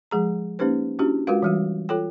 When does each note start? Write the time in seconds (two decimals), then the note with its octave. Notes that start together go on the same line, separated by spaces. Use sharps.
0.11 F3 G#3 G#4 A#5
0.59 A#3 C#4 D#4 G4 B4 C5
0.99 C#4 D4 E4 F#4 G4
1.27 G#3 F4 F#4 A#4 B4 F5
1.43 E3 G3 F#4
1.89 F4 A4 C#5 G5